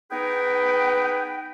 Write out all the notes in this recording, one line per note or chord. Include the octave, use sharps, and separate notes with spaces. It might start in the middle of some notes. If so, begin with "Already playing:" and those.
B3 D#4 G#4 B4 G5